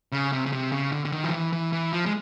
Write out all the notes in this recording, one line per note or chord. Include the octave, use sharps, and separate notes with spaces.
C#3
C3
C#3
C3
C#3
D3
D3
D#3
F3
E3
E3
E3
F3
G#3